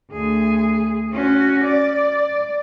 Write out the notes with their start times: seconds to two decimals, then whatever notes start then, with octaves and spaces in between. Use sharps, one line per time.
0.11 D2 G#4
1.13 C#4 F#4
1.65 D5